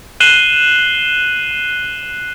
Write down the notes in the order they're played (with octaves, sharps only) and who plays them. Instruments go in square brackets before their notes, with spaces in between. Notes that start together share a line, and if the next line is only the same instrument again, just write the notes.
[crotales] F#6 C7 D#7 E7 F#7 G7